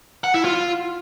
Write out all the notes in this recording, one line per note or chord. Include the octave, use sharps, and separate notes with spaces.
F#5
E4
F4